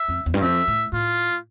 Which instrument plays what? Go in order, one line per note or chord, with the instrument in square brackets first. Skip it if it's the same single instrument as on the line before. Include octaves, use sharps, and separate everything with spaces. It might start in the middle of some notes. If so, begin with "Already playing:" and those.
Already playing: [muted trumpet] E5
[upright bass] F2
E2
G2
[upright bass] F2 [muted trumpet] E5
[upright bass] A2
[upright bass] A2 [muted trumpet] F4